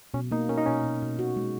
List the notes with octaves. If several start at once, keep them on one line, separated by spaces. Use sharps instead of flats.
B2 C#4
A#3 D#4
C#4 A#4
D#4
B2 C#4
B2
B2
F#4
G#3